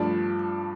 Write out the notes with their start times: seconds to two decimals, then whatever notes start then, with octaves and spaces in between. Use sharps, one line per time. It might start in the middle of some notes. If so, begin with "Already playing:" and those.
Already playing: G2 F3 A3 D4